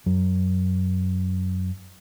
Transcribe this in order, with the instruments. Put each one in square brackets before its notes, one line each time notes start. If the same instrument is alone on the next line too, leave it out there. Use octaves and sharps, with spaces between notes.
[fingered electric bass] F#2 F#3